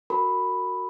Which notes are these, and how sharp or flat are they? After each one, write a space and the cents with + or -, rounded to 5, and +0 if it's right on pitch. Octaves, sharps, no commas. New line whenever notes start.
F#4 +0 A#4 -20 B5 +0